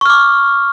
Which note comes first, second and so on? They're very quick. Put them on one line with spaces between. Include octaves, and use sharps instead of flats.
C#6 F6 D6